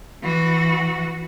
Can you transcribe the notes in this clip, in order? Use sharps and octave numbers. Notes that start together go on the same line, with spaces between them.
E3 F#4